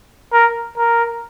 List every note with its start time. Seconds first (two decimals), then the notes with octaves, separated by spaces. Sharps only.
0.33 A#4
0.77 A#4